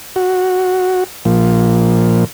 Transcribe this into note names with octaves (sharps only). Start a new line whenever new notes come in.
F#4
A#2 F3